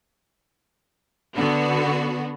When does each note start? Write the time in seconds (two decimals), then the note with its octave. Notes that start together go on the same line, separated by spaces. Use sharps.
1.35 D3 B3 F#4